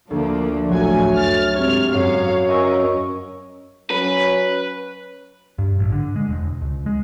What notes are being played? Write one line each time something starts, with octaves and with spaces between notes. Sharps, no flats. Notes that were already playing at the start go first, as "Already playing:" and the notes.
D2 F3 A#3 D4
A1 F#3 A3 F#4 G#5
F#2 F6 A6
G#2 C3 C#5 F6
F#2 C#5 F5
C#4 A#4 D#5 C#6 E6
F#3 C#4 B4
G2
A1
D3
G#3
E1
C#2
G#3